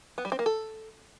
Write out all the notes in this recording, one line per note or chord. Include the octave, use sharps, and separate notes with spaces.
B3
G3
C4
A#3
A4